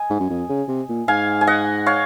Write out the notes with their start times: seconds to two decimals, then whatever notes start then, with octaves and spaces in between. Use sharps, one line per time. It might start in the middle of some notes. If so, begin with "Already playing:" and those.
Already playing: D#5 G#5
0.10 G#2
0.20 F#2
0.30 F2
0.49 C#3
0.69 C3
0.89 A#2
1.08 G#2 F5 G#5
1.41 G#5
1.47 D#5 F#5
1.86 C#5 F5